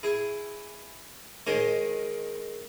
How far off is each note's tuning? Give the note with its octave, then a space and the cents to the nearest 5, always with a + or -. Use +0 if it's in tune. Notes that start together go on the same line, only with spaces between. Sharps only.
E4 +5 G#4 +0
D#3 +0 G#3 +10 C#5 -35